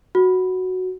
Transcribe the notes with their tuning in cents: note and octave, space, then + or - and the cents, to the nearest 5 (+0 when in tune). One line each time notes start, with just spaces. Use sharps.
F#4 +0